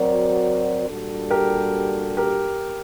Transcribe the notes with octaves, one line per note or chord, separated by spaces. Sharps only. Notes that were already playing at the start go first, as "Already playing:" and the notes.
Already playing: F#3 C4 F#4 A#4 D5
A#2 G3 D4 F#4 A4
G4 A#4
G4 A#4